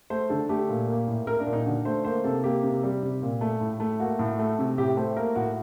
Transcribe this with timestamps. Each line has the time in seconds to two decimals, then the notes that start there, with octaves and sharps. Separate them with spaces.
0.10 A3 C5
0.30 D3 A4
0.49 A3 G4
0.69 A#2
0.88 A#3
1.08 A2
1.27 A#3 A#4
1.40 D4
1.47 A#2
1.53 D#4
1.66 D3 F#4
1.85 A3 C5
2.05 A#3 C5
2.24 C3 A4
2.44 A#3 G4
2.64 C3
2.83 G3
3.03 C3
3.22 A#2
3.41 A3
3.61 A2
3.80 A3
4.00 A#3 F#4
4.19 A2
4.39 A3
4.59 C3
4.78 A2 G4
4.97 A3 C5
5.16 A#3 A#4
5.35 A2 F#4